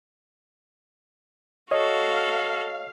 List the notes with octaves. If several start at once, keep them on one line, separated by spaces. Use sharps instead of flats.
F#4 A4 C#5 D#5 F5